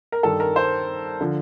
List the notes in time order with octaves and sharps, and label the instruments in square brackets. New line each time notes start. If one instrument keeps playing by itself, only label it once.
[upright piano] A#4
G2 D#3 A4
A#4
C5
D3 F3